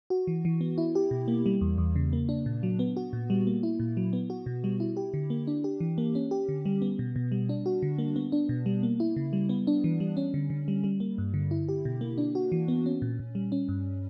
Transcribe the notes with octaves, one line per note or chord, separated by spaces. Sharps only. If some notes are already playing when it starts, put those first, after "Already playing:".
F#4
E3
E3
B3
E4
G4
B2
A#3
G3
E2
E2
C#3
A#3
D4
A#2
F#3
B3
F#4
A#2
G3
A#3
E4
A#2
F#3
B3
F#4
B2
G3
E4
G4
D3
A#3
D4
G4
E3
A#3
C#4
G4
D3
G3
B3
B2
B2
G3
D4
F#4
D3
A#3
B3
D4
B2
G3
A#3
E4
C#3
G3
B3
D4
E3
G3
C#4
D3
D3
G3
G3
A#3
G2
D3
E4
G4
B2
A#3
D4
F#4
E3
B3
C#4
A#2
A#2
G3
C#4
G2